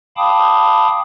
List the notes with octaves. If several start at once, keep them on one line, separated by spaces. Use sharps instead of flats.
F5 G5 A5 B5 D6 D#6